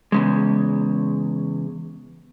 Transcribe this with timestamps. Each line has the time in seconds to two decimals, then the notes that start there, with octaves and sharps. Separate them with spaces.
0.12 E2 C#3 G#3